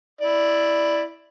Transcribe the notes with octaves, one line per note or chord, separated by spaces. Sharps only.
E4 D5